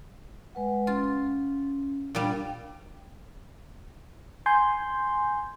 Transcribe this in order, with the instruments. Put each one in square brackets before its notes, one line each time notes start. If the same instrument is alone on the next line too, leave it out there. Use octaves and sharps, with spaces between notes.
[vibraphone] G#3 B4 F#5
[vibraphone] C#4 [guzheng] F4
[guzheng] A#2 G3 [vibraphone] D4 F5
[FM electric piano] G#5 C6 G6